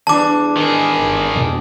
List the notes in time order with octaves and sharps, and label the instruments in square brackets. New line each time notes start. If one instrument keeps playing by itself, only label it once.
[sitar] E2 G2 D4 [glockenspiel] A5 D6
[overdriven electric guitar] D#3 G#4
[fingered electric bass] G1
F2 B2